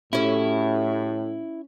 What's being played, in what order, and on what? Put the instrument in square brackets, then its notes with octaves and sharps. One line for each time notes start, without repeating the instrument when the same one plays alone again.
[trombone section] A2 [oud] C#4 C#5 [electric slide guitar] E4 [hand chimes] F#4 G4 A4